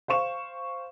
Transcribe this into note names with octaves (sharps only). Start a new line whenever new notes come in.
C5 F5 C#6 E7